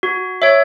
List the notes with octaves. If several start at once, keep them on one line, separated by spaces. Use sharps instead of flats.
F#4
C#5 E5